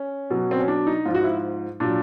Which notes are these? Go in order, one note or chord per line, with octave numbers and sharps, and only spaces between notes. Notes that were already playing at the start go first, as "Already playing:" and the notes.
Already playing: C#4
B2 F#3
C4
C#4
D4
D#4
G#2 F3 F4
F#4
E4
A#2 F#3 D4